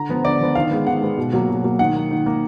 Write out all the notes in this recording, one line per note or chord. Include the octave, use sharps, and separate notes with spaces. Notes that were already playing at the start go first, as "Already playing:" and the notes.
Already playing: D3 A#5
F3 B3
D3 D5
F3 B3
D#3 F5
G#3 B3
D#3 F#5
G#3 B3
B2
F#3 A#3
B2
F#3 A#3
D#3 F#5
A#3
D#3
A#3